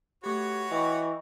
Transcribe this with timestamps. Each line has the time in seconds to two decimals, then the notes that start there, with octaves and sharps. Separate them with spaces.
0.24 A3 F#4 G4 B4 C#5
0.71 E3 D#5 G5 C#6